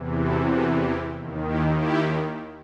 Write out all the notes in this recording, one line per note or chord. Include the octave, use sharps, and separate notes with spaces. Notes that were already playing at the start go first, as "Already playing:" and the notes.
Already playing: E2 C3 E3
F#4 A4
F#4 A4
E4 G4
D#2 D#3
E4 G4
E4 G4